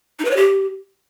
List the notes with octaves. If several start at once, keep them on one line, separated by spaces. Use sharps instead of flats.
D#4
B4
C#5
G4